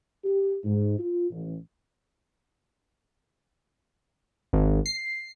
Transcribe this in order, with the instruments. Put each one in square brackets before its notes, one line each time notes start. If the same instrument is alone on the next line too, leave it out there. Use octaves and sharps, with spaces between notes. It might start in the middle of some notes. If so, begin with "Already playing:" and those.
[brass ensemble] G4
G#2
F4
A1
[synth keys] G#1
C7